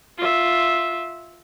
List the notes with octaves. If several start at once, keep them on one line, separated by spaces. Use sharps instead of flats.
F4 E5